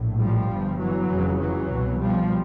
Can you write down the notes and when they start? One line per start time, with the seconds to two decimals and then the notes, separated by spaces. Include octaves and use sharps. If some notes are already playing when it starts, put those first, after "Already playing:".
Already playing: A#1 A2
0.20 F3 G3
0.50 G1 G2
0.80 E3 F#3
1.10 F1 F2 C#3
1.40 E3 F#3
1.70 C2 B2
2.00 F3 G3